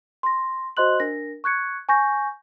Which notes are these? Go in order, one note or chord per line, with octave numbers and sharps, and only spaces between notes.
C6 A#6
F#4 C5 D#5 C6 F#6 F#7
D4 A#4 A#6
C#6 F#6 G#6 C#7
G#5 C#6 G6 A#6